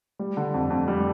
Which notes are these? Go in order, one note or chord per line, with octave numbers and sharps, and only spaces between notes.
G3
D3
F2
F2
G3